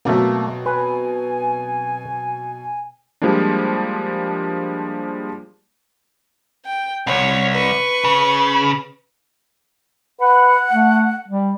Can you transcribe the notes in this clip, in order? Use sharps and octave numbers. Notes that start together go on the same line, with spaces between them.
B2 F#3 A3 A#3 C4
B4 G#5
F3 G3 G#3 A#3 D4
G5
C2 C#5
B4 C#6
C#3
B4 F#5
A3
G3